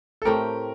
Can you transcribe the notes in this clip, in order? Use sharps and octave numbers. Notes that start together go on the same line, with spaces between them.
A4
A2 A3 C4 G4 A#4